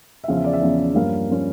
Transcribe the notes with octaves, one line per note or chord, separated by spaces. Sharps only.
E5
E2 C#3 F3 C#4 F5
E5
D5
E5
E2 C#3 F3 C#4
G2 F3 A#3 C#4 F5
F3 A#3 C#4